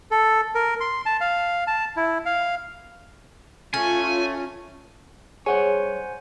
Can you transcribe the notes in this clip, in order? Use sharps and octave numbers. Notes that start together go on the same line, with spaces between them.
A4
A#4
C6
A5
F5
A5
E4
F5
A3 C#4 F4 C#5 G#5
G2 G#4 C5 C#5 F#5 G#5